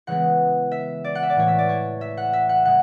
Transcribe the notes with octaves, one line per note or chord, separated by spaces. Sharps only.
C#3 E3 G#3 B3 F#5
E5
D5
F#5
E5
D5
A2 E3 A3 C#5
E5
D5
C#5
E5
F#5
E5
F#5
C#3 G#3 F#5